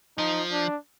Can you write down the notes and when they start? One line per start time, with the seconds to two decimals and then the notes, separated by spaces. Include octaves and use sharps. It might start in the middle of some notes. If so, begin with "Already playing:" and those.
0.18 F3 D#4
0.52 D4